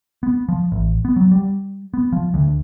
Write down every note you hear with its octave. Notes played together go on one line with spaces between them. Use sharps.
B3
F3
A1
B3
F#3
G3
B3
F3
D2